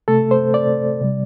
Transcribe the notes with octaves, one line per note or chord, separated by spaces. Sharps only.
C3 A3 A4
C5
D5
C3 G3